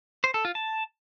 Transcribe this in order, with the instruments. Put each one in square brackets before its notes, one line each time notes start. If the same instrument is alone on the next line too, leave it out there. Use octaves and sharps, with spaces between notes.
[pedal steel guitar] C5
A4
F4
A5